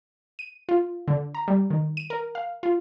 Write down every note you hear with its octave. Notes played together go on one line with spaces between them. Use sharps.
D#7
F4
D3
A#5
G3
D#3
D#7
A#4
F5
F4